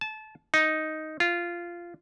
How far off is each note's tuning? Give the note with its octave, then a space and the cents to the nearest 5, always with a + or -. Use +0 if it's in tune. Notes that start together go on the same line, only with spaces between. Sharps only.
A5 -25
D#4 +5
F4 -15